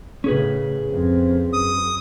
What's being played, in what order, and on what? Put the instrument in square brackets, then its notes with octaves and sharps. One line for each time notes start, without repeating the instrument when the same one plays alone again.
[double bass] A2 C#3 [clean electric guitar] C#4 G#4 B4
[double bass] F2 C4
[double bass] F#2 [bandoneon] D#6